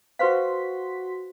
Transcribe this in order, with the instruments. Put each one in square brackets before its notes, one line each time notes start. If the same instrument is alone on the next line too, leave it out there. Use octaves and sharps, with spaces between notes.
[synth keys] F#4 C6 B6 [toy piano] B4 C5 F5